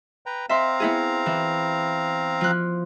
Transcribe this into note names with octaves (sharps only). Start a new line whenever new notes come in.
B4 G5 A#5
C4 E5 F5 A#5 C6
B3 E4 G#4
E3
F3 F#6